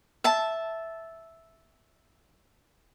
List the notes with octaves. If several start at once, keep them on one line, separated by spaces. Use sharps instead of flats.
E5 A5